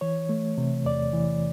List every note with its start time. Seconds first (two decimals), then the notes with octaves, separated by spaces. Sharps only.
0.01 E3 C#5
0.29 A3
0.58 C3
0.85 E2 D5
1.13 E3